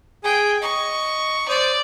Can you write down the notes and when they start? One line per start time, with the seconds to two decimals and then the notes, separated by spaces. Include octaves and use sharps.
0.24 G#4 G5 G#5
0.62 D#5 C#6
1.48 C5 D5 D#6